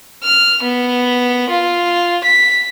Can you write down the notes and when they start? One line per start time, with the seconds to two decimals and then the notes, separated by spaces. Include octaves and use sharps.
0.24 F6
0.63 B3
1.51 F4
2.24 B6